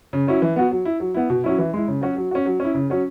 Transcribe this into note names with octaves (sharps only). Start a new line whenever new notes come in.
C#3
F#3 C#4 E4
E3
B3 F#4
F#3
E4
F#3
B3 E4
B2
F#3 C#4 E4
E3
G#3 E4
C#3
F#3 C#4 F#4
F#3
C#4 F#4
F#3
C#4 E4
C#3
F#3 C#4